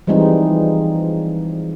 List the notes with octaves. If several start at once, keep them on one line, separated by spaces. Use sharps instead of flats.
E3 F3 G3 G#3 C4 D#4